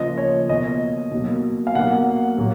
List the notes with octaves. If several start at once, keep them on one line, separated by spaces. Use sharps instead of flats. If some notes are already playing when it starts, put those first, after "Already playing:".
Already playing: C#3 F3 A#3 D#5
C#5
B2 A#3 D#5
B2 F#3 A#3
F5
B2 F#3 A#3 F#5
A#2 F#3 A#3